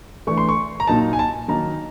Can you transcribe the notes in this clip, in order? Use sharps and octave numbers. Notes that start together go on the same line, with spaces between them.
E3 A3 D4 C#6
C6
C#6
A#5
A#2 F#3 A#3 D#4 A5
G#5
A5
D#3 F#3 A#3 D#4 A#5